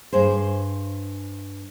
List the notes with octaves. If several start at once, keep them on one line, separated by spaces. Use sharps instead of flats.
G2 G#4 C5